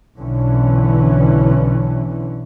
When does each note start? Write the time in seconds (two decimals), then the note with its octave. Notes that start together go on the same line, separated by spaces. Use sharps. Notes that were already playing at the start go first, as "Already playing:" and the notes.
0.17 B1 D3 E3 C#4